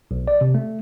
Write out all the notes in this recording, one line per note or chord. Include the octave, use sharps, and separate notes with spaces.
B1
D5
C3
A3